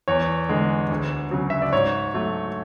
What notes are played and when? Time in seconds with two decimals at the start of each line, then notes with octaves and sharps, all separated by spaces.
0.08 E2 C#5
0.49 D3 G#3
0.90 D2
1.31 C#3 F#3
1.50 E5
1.62 D5
1.72 G#2 C#5
2.14 F#3 A3